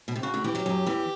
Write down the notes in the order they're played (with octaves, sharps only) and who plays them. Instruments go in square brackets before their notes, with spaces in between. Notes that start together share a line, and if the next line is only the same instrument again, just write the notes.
[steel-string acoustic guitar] B2
C3
[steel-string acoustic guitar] C#3 [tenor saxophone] F#4
[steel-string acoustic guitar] D2 D3
[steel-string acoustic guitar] E2 E3 [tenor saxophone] G4
[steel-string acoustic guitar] F#2 F#3
F#2 F#3
E2 E3